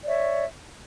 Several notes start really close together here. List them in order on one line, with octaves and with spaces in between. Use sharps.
D5 C#5 E5